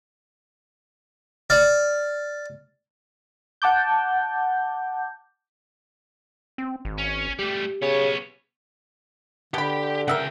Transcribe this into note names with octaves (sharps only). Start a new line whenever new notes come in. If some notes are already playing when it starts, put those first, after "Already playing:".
D5 F6
F#5 A5 D6 G6
C4
G#1
C#4
G3 A3 G4
C#3 B3 C#5
B2 D3 G4 B5
C#3 A#4 E5 F#5 G5